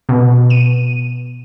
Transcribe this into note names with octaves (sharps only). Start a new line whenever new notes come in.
B2
D#7